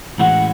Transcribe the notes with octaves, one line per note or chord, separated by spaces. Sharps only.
A2 E3 G#3 C#4 F#4 F#5